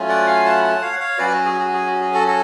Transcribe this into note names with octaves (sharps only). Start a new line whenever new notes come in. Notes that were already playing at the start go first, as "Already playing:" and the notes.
Already playing: F#3 A3 C#4 F4
D5 F#5
F5 G#5
F#5 A5
B5
F#5 A5
C#5 F5
F#5
C#5 F5
F#3 C#4 F#4 B4 D5
F#4
G#4
F#4
G#4
F#4
G#4
F#4 A4
F#4 A4